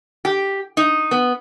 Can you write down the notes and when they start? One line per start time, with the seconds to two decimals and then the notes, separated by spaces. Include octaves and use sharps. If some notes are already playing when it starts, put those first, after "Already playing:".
0.25 G4
0.77 D#4
1.11 B3